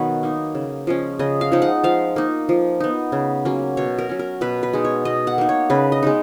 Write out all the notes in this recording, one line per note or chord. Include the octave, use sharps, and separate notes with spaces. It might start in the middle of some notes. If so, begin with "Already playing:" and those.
Already playing: B2 D#3 F#3 B3 B4 C#5
A#3 D#4
C#3
F3 G#3 C#4
C#3 D#5
F5
F3 G#3 D#4
F#5
F3 F5
A#3 D#4
F3
B3 D#4
C#3
F#3 A#3 C#4
B2 C#5
A#4
F#3 C#4
A#4
B2 B4
B4
G#3 D#4
C#5
B2 D#5
F#5
A#3 D#4
C#5
C#3 B4
D#5
G#3 B3 D#4